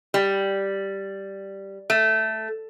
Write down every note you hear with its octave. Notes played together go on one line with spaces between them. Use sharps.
G3
A3